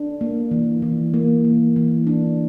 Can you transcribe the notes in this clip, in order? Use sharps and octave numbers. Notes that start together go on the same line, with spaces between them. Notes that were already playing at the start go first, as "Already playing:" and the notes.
Already playing: D4
A#3
E3
E3
A#3
E3
E3
D4